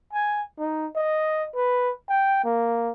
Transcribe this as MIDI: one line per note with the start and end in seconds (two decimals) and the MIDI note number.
0.13 0.42 80
0.59 0.87 63
0.96 1.45 75
1.55 1.92 71
2.09 2.42 79
2.44 2.92 58